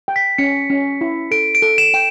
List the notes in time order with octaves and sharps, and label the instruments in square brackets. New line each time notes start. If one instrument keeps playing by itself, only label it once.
[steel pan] G5
[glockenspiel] B6
[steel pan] C#4 [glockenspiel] C#7
[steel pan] C#4
E4
[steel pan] A4 [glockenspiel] D7
[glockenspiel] D7
[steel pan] A4
[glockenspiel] E7
[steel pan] G5